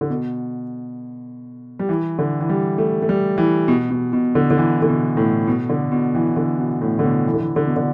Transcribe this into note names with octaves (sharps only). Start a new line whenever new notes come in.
D3
B2
G3
E3
D3
E3
G3
A3
A3
G3
E3
B2
B2
B2
D3
D3
E3
D3
B2
A2
B2
D3
B2
E3
D3
B2
A2
D3
B2
E3
D3
E3
D3
B2
D3